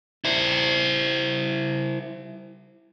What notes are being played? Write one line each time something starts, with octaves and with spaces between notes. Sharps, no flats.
E4 C5